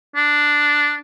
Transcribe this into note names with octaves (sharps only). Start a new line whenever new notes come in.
D4